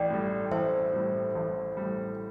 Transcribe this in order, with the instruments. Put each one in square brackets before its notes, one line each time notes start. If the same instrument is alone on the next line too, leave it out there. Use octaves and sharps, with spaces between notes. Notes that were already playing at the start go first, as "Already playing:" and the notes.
Already playing: [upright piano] A1 A2 [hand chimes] D5 G5
[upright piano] A2 G3
[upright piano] A1 [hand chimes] C5 E5
[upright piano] A2 G3
A1
A2 G3